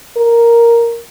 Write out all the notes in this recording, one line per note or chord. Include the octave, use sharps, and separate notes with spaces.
A#4